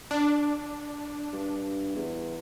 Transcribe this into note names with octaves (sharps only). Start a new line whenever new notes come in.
D4
G2
E2